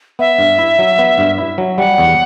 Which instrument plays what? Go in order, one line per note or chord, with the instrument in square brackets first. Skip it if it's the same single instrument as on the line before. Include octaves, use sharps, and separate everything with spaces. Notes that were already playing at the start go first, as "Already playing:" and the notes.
[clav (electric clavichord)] B3 [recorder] E5
[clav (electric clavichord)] G2
E4
F#3
B3
G2
E4
F#3
[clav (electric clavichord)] G3 [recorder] F#5
[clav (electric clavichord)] E2